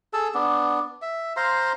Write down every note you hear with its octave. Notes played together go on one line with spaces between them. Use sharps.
G#4 A4 A5 E6
B3 D4
E5
C5 F5 A#5 C6